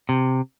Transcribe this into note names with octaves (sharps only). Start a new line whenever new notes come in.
C3